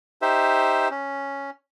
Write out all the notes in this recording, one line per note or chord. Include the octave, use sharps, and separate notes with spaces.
D#4 G4 C5 E5
C#4